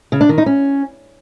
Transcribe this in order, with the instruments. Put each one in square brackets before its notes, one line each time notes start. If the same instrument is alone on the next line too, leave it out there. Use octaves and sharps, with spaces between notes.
[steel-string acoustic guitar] C#3
D4
D#3
D#4
C#4